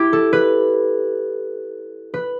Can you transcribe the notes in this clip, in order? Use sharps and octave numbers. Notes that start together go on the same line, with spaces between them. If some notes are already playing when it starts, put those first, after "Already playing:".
Already playing: E4 G4
A4
B4
B4